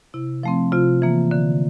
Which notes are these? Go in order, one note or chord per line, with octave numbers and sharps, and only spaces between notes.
C3 E4
F3 A3 C4
C3 F4
E3 A#3
D3